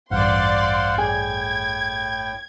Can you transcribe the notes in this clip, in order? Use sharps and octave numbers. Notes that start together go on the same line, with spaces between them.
A1 E2 G2 C5 D5 F5 F#5 C6
A2 G#4 G5 G#6